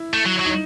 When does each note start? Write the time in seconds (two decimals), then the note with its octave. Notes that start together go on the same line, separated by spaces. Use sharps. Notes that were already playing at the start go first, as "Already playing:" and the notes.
Already playing: E4
0.14 A3
0.26 F#3
0.40 F#3
0.45 D#4